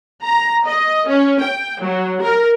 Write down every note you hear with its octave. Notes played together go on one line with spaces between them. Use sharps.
A#5
D#5
C#4
G5
F#3
A#4